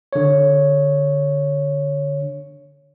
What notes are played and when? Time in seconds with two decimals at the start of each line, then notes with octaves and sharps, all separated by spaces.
0.13 D3 C#5